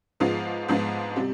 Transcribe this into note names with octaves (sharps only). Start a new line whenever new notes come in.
G#2 F3 G#3 B3 F4
G#2 F3 G#3 B3 F4
C3 G3